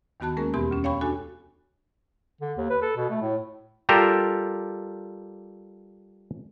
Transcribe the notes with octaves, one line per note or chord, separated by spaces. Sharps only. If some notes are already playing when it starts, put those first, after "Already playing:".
D#2 D#3 B3 F#4 A5 F#6
G#3 A#3 C#4 G#4 A#4
E2 B2 E3 B3 G4 C6
D2 C#4
C#5 F5 G5 B5 C#6
D4 F#4 A4 G#5
D3
D#2
B4
A4
B2
A3
A2
G3 F4 G4 A4 A#4